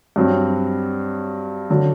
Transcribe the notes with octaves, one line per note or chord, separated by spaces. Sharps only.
G2 F#3 C4
D3 F#3